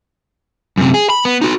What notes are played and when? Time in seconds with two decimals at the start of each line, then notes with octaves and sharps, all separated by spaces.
0.78 F#2 C3
0.94 G#4
1.10 B5
1.25 B3
1.41 D#4 F#4